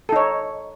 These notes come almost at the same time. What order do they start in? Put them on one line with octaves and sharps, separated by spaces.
A4 D#4 C#5